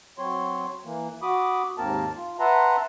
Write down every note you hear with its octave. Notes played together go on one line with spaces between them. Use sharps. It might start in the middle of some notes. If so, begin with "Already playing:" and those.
F#3 C4 C#5 C6
E3 A#3
F#4 B5 D6 D#6
D#2 G#2 A#3 C4 A#4 A5
F4
B4 E5 F#5 A5 A#5 C6